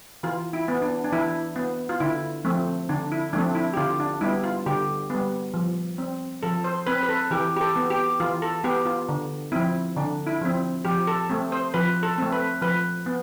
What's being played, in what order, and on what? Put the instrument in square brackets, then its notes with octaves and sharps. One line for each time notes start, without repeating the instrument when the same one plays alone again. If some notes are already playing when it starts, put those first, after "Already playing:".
[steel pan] E3 F4
E4
B3
D4
D4
E3 E4
B3
F4
D3 E4
F3 A3 C4
D3 D4
E4
F3 A3 C4 D4
E4
G4
D3 F4
D4
G3 B3 E4
F4
D3 G4
G3 B3
F3
C4
F3 A4
C5
C4 B4
B4
A4
E3 G4
G4
A4
B3
G4
E3 F4
A4
B3 G4
F4
D3
F3 C4 E4
D3 D4
E4
F3 C4
F3 G4
A4
A3 C4
C5
F3 B4
A4
A3 C4
B4
F3 B4
B3